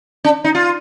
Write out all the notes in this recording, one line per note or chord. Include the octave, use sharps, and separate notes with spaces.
D4
D#4
F4